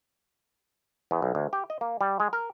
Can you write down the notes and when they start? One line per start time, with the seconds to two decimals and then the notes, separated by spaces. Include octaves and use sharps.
1.11 E2
1.22 B1
1.35 D2
1.53 G4
1.70 D#5
1.81 A#3
2.01 G3
2.20 G#3
2.33 A#4